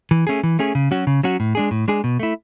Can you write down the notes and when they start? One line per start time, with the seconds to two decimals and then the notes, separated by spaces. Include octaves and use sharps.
0.11 E3
0.27 A3 C#4 G#4
0.43 E3
0.59 A3 C#4 G#4
0.75 C#3
0.91 F#3 C#4 F#4
1.07 C#3
1.23 F#3 C#4 F#4
1.40 A2
1.55 G#3 D4 G#4
1.71 A2
1.88 G#3 D4 G#4
2.04 B2
2.19 A3 E4